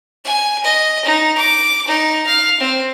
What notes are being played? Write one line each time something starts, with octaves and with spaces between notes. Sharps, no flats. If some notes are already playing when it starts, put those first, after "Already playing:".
G#5
D#5
D#4
D6
D#4
F5
C4